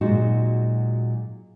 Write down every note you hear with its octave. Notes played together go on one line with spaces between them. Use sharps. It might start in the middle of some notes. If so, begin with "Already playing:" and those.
A#2 F#3 G#3 D#4 F#4